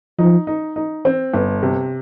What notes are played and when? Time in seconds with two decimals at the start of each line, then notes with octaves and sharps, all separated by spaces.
0.19 F3 D#4
0.47 D#4
0.76 D#4
1.05 C4
1.34 G1
1.63 C3